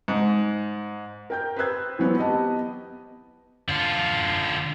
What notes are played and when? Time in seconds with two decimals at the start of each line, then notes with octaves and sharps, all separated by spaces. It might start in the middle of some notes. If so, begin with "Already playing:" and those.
0.08 G#2
1.30 A#4 G5 G6
1.56 B4 C5 D#6 E6 F#6 G#6
1.99 E3 F#3 B3 C4
2.18 B3 G4 D#5 A5
3.69 D3 F4